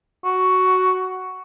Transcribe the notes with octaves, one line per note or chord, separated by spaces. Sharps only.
F#4